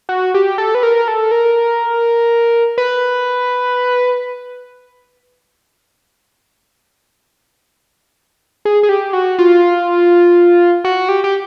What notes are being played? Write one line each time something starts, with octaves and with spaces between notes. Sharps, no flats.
F#4
G4
A4
B4
A#4
A4
A#4
B4
G#4
G#4
G4
F#4
F4
F#4
G4
G4